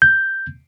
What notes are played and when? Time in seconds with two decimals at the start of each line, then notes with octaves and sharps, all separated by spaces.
0.02 G6